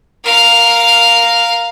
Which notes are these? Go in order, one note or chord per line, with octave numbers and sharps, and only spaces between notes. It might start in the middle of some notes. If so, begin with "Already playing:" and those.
A#4 F5